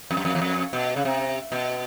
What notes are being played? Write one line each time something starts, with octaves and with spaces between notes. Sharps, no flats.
F2
F#2
F2
E2
F2
B2
C#3
C3
B2